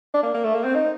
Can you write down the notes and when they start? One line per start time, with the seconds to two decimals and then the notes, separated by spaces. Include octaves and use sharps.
0.14 D4
0.23 A#3
0.34 A#3
0.44 A3
0.54 A#3
0.64 C4
0.75 D#4